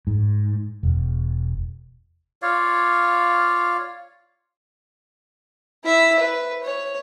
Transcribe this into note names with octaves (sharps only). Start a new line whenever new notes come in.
G#2
E1
F4 C#5 D5 F5
E4 E5
B4
C#5